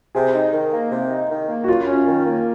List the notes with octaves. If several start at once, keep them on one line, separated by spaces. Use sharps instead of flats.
C3 G#4
D#4
D#3
A#3
C3
D#4
D#3
A#3
F#4
F#2 F4
C#4
D#3
A#3